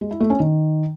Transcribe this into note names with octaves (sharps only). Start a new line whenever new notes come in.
G#3
E4
A3
C#4
D#3